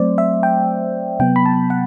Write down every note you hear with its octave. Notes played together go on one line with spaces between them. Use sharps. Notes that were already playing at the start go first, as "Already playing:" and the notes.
Already playing: F#3 A3 C4 C5 D5
E5
G5
C3 F#3 B3 G5
B5
A5
F#5